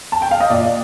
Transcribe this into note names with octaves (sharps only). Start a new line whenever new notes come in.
A5
G5
F5
D#5
A#2 D5